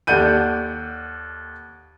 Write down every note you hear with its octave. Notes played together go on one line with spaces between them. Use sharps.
D#2 A4 D5 F#5 G6 D#7